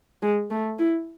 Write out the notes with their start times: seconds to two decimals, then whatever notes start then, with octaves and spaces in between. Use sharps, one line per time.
0.22 G#3
0.51 A3
0.79 E4